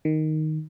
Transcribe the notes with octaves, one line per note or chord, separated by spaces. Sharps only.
D#3